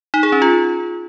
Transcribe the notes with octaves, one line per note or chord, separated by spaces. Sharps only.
D#4
G#4
C#4
F4